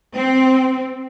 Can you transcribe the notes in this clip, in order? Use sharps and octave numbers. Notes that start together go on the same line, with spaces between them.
C4